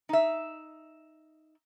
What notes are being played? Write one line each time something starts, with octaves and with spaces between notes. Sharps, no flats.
D#4 E5